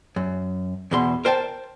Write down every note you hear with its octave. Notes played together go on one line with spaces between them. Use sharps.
F#2
E2 B2 C6
A#4 C5 G5 A5